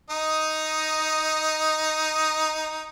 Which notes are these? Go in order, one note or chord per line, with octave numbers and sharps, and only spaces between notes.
D#4 D#5